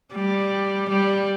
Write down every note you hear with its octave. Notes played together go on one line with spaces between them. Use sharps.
G3
G3